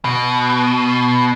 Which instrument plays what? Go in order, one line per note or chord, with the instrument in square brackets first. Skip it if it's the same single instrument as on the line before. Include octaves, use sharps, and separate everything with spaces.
[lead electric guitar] B2